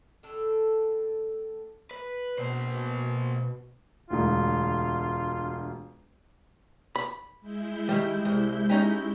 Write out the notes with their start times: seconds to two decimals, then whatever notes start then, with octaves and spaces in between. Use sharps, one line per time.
0.23 A2 D3 D4 A4
1.91 B4
2.38 B2 A#3 C5
4.10 E1 D2 F4
6.96 B5
7.41 G#3 E4 G6
7.89 D#3 G3
8.25 C2
8.70 C#4 D#4 G4